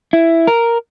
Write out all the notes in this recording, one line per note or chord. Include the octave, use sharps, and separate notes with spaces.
E4
A#4